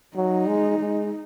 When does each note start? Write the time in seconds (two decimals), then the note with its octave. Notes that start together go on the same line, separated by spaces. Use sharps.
0.16 F#3 D#4
0.48 G#3
0.79 G#3